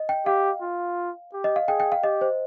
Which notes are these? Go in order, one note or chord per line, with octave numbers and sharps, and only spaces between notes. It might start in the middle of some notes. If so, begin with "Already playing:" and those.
Already playing: D#5
G5
G4 F5
F4
G4
D#5
F5
G#4 G5
G5
F5
G4 D#5
C5